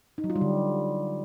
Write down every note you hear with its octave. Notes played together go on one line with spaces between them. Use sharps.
D#4
F#3
F4
G3
D3